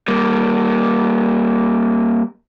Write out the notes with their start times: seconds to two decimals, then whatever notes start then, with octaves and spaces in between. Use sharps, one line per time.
0.08 G3 A#3